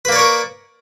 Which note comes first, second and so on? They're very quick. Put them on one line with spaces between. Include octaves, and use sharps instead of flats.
B4 A#3 D5 C#5 A#4